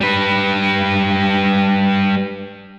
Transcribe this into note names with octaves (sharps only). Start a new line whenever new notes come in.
G3 B4